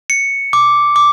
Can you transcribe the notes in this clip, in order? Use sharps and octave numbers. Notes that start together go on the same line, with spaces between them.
C#7
D6
D6